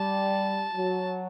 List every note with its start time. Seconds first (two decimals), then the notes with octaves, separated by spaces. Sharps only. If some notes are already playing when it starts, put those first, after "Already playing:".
Already playing: G3 A5
0.75 F#3